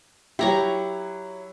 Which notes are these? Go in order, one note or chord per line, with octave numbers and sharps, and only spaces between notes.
F#3 E4 G4 A#5 C#6